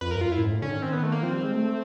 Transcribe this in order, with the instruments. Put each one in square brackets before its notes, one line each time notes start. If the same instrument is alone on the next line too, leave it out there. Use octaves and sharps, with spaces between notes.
[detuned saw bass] F2 [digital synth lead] B4
[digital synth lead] A#4
[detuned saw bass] G2
[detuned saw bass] F#2 [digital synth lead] F4
[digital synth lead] E4
[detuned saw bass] A2
G#2
A2
[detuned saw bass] D3 [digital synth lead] C#4
[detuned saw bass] D#3
[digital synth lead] C4
B3
A3
A#3
[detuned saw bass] F3 [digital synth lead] C4
[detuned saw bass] G3
G#3
A3